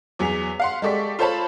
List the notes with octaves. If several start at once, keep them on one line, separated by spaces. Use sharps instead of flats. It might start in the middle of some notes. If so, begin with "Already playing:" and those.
E2 F#3 G#4 B6 F7
F5 F#5 C6
G#3 G4 A4 D5 C#6 B6
F4 A4 C5 C#5 A5 B5